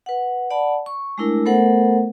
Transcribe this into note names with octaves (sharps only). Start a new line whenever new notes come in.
B4 F#5
D5 F#5 A5 B5
C#6
G#3 A3 D4 E4 A#4
A3 B3 A4 A#4 C5 F#5